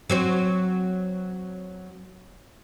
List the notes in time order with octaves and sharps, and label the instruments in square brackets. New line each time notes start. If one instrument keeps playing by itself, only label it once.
[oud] F#3 C4 F#4